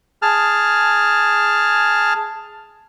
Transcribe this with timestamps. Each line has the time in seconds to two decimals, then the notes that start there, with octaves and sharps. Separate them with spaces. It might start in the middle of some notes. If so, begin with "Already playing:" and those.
0.22 G#4 A5 F6